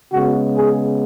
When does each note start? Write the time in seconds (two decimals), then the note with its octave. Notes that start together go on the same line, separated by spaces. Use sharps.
0.13 C#3 G#3 B3 F#4
0.57 G#4